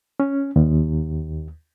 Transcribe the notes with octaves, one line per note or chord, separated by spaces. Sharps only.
C#4
D#2